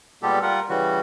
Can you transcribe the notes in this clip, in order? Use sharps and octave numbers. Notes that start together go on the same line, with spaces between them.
A#2 G3 G#3 B3 G4 A4
G3 F4 A#4 F#5
C#3 E3 G3 F#4